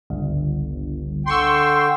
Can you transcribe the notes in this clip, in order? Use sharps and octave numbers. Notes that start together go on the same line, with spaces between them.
G1 C#2
D3 G5 C6 C#6 E6